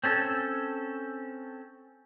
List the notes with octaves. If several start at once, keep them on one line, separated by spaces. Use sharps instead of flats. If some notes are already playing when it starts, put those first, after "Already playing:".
C4 C#4 A4